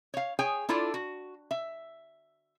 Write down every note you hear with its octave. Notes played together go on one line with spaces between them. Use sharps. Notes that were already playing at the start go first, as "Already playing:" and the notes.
C#5 F5
G#4 C#5 G5 G#5
D4 E4 F4 A4 D5
F#4
E5